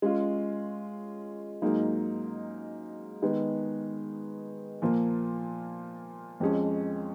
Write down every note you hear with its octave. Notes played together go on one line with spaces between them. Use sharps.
G#3 C#4 F4
G#2 F#3 A#3 D#4 G#4
D#3 G#3 B3
A#2 F3 A#3 F4
F2 F3 G#3 C#4 G#4